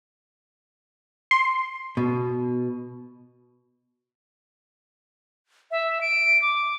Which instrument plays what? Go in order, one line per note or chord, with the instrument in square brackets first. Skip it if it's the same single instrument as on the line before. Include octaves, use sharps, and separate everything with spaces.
[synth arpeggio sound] C6
[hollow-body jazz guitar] B2
[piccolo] E5
D7
D6